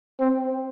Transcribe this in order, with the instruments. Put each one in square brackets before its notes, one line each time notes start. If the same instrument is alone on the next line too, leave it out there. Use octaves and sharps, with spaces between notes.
[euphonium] C4